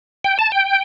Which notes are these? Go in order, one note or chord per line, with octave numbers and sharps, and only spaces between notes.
G5
A5
G5